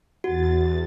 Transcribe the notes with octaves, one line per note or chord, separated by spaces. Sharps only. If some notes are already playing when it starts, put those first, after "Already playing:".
E2 F#4 A6